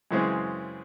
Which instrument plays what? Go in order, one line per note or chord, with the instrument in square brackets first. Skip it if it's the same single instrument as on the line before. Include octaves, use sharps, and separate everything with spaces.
[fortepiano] F#2 C#3 E3 G#3 C4